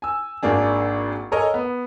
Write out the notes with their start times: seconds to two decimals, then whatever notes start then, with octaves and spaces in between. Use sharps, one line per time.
0.02 G#5 E6
0.43 G#1 A#3 D4 G#4
1.32 A4 A#4 C#5 D#5 G#5 D#6
1.54 B3